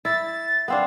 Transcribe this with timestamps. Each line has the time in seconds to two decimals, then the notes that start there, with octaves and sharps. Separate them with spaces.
0.05 E4 A6
0.68 B3 C4 D4 F5